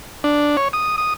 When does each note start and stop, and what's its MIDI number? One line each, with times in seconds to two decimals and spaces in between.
0.24 0.57 62
0.57 0.68 73
0.73 0.96 87
0.98 1.14 87